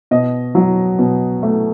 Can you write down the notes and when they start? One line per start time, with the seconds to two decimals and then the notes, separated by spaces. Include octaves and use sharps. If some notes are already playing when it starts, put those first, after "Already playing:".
0.11 B2 D#5
0.55 F#3
0.99 B2
1.43 A3